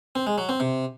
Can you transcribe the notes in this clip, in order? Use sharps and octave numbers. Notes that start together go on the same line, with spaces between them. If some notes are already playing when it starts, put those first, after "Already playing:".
C4
G#3
F#3
C4
C3